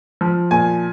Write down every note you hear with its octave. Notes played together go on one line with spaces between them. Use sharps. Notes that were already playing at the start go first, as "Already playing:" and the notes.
F3
A#2 G#5